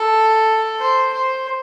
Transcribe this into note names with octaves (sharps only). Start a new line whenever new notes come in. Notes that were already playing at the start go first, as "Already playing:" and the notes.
Already playing: A4
C5
C5